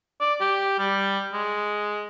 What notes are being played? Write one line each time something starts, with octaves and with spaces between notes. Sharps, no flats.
D5
G4
G3
G#3